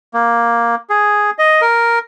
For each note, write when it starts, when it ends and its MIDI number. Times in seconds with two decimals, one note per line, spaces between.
0.14 0.75 58
0.90 1.30 68
1.39 1.61 75
1.61 1.99 70